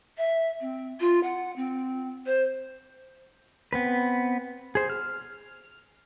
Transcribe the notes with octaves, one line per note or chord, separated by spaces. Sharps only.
E5
C4
F4
F#5
C4
C5
B3 C4 B4
G#4 C5
F6